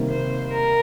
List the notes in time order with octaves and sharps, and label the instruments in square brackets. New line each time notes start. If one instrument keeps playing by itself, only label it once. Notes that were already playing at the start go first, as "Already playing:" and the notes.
Already playing: [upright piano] C3 D#3 G3 A#3
[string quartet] C5
A#4